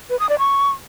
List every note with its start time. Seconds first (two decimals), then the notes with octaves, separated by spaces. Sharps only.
0.10 B4
0.19 D#6
0.29 D5
0.39 C#6